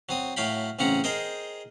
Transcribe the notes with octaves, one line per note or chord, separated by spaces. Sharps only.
F#3 C4 D#6
A2 F#3 F5 G5 B5
A1 C#3 C4 C#4 F#5 A#5
G#4 A#4 C5 D#5 G5